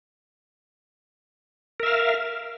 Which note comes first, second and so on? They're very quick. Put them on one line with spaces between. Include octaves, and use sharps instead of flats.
A#4 E5 F5